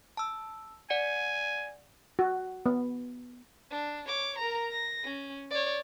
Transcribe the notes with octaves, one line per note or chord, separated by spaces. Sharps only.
A5 E6
D5 F#5 G#5 C#7
F#4
B3
D4
C#5 D6
A#4 A#5
A#6
C#4
C#5 D5